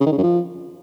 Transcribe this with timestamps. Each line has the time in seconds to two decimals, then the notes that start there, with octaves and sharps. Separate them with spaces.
0.01 C#3
0.06 D#3
0.12 C#3
0.18 F#2
0.23 F3